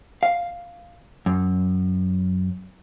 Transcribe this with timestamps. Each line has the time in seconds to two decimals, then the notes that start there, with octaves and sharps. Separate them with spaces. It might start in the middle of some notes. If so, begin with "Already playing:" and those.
0.23 F5
1.26 F#2